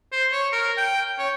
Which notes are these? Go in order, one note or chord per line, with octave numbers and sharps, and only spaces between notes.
C5
C#5
A#4
G5
C#5